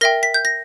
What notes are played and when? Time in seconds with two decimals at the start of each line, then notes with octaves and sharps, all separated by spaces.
0.01 A#4 E5 G5 A#6
0.23 B6
0.34 G6
0.45 A#6